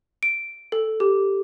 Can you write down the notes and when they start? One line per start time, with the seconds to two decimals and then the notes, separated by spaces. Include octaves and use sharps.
0.23 D7
0.72 A4
1.00 G4